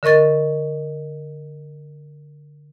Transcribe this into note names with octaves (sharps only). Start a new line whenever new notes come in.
D3 A#4 D#5 C#6 A6